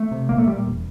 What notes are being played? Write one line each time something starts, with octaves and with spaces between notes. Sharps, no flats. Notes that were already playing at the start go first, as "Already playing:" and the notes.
Already playing: A3
C3
A#1 A#3
A3
A#2 G3
E1